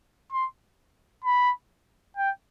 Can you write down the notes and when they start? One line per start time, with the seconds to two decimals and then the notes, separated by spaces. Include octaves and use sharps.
0.32 C6
1.24 B5
2.17 G5